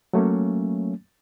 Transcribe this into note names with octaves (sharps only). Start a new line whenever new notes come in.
F#3 A3 A#3 C#4